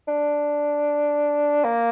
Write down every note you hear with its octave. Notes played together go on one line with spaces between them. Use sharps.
D4
A#3